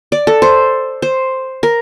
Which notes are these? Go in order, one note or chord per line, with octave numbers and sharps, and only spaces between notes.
D5
A4
C5
C5
A#4